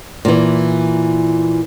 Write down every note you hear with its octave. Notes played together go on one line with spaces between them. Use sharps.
A#2 E3